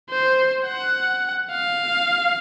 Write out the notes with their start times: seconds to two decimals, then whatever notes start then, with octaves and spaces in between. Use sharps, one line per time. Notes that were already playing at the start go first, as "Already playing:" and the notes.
0.10 C5
0.66 F#5
1.51 F5